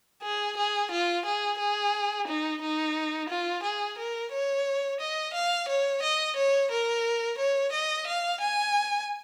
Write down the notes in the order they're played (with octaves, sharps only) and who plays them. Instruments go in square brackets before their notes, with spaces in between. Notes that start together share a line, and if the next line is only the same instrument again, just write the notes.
[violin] G#4
G#4
F4
G#4
G#4
D#4
D#4
F4
G#4
A#4
C#5
D#5
F5
C#5
D#5
C#5
A#4
C#5
D#5
F5
G#5